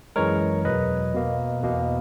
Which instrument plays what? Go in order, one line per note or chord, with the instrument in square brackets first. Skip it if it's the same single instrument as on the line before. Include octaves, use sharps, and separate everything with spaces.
[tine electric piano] F#2 E3 G#3 A#4 C#5
E2 B2 F#3 B4 D#5
B2 A#3
E2 B2 A#3